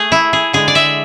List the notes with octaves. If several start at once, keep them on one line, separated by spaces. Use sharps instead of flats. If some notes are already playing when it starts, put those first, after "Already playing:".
Already playing: A3 G#4
E4
G#4
D3 G#3 G#4
D5
E5